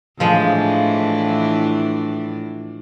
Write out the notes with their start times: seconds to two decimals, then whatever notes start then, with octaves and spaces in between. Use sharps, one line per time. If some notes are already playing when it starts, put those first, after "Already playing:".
0.20 A2 E3 F3 G#3 D4